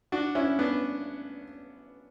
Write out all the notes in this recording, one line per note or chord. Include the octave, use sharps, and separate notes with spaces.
D4 F#4
C#4 E4
B3 D4